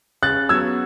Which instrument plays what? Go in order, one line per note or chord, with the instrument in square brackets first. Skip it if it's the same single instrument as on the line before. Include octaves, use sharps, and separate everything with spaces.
[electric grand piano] C#3 [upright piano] F#6 A6
[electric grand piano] F#3 B3 F#4 [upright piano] E6 G#6